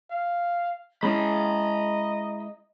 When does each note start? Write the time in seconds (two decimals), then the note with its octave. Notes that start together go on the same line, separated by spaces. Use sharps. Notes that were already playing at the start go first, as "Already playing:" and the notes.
0.11 F5
1.03 G#3 C#4 E4 D#5 A#5 B5